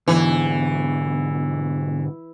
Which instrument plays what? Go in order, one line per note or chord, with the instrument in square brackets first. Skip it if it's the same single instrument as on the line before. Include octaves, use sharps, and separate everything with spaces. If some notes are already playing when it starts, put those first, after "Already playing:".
[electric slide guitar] G#2 B2 D3 [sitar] E3